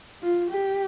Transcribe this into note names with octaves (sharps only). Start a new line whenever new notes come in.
F4
G4